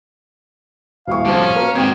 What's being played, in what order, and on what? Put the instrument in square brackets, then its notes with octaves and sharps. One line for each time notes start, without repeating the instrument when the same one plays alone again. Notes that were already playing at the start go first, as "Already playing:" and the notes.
[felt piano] D#1 E4 C#6 [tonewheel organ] A2 [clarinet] F5
[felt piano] C2 F3 [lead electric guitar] D3 C#4
[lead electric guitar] C#4
[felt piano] A#3 F#4 A#4 [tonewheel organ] B4
[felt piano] G#1 G5 G#6 [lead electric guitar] B2 A#3 [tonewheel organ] C4